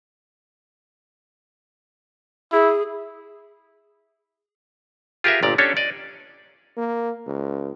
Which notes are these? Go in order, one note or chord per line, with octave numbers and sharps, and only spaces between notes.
E4 G#4
F4 G4 G#4 A#4 B4 E5
G1 A#2 D5 A#5
C#4 D4 G4 A4 C#5
D5 D#5
A#3
C#2